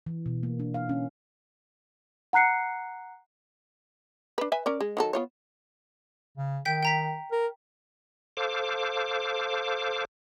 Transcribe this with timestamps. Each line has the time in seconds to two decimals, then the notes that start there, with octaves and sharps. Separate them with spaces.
0.06 E3
0.26 B2
0.43 A#3
0.59 D4
0.74 F5
0.89 C#4
2.33 F#5 A#5 F#6 C7 C#7
4.38 D4 B4
4.52 B4 E5 G#5
4.66 C#4 A#4 D5
4.81 G#3
4.97 D#3 F#3 A4
5.13 B3 F4 C#5
6.37 C#3
6.65 D#3 G5 G6 B6
6.83 G5 A#5 B6
7.32 A#4
8.37 A4 C5 F5 D6